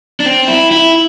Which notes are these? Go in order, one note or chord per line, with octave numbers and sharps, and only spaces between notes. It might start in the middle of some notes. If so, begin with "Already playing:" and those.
D4
C4
E4
E4